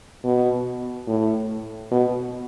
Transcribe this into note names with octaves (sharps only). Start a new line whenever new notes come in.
B2
A2
B2